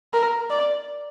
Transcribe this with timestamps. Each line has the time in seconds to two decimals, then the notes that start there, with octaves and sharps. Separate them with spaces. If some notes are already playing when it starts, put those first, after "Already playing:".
0.13 A#4
0.50 D5